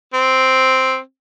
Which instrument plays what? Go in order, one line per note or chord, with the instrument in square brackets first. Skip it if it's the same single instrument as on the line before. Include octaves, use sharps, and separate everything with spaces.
[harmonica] C4